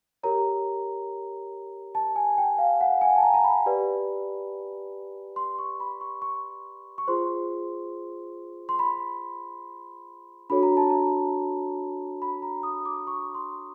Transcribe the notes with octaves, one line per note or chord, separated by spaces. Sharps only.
G4 A#4 C#5 A#5
A5
G#5
G5
F5
F#5
G#5
A5
A#5
A#5
B5
G4 B4 D5
C6
C#6
B5
C#6
C#6
C#6
F4 G#4 C5 C6
C6
B5
D4 F#4 A4 C#5 B5
A#5
A5
A#5
B5
A#5
D#6
D6
C#6
C6